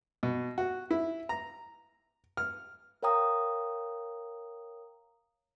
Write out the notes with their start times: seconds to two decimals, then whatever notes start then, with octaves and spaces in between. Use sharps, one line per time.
0.23 B2
0.58 F#4
0.91 E4
1.29 A#5
2.37 F6
3.03 A#4 C#5 F5 G5 A#5 D#6